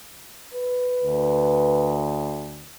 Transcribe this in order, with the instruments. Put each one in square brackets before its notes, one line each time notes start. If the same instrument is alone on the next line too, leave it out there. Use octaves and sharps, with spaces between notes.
[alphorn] B4
[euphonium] D2